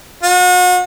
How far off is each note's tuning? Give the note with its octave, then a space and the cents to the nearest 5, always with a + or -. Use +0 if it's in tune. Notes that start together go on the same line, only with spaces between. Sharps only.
F#4 -40